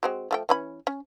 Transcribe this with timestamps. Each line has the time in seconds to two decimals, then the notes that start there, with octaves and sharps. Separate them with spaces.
0.03 G#3 C4 F#4
0.31 F3 A3 G5
0.49 E3 C#4 B5
0.87 C#4